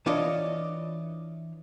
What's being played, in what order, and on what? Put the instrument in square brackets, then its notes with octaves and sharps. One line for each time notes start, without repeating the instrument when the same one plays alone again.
[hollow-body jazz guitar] E3 D4 F4 C#5 D#5